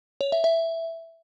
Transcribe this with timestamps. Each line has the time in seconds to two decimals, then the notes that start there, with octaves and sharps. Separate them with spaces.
0.21 C#5
0.32 E5
0.44 E5